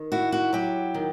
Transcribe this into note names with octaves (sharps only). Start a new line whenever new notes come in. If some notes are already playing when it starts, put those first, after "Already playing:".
Already playing: D#3
E4 F#4
F#4
F#3 G4
D#3